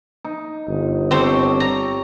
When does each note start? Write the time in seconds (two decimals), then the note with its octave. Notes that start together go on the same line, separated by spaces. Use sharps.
0.25 D#4
0.68 G1
1.11 C4 G4 A4 C5 C#5
1.60 A#5